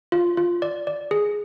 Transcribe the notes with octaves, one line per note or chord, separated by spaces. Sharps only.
F4
F4
D5
D5
G#4